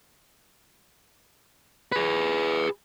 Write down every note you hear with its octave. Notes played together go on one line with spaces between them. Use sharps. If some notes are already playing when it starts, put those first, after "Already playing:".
G#4 B4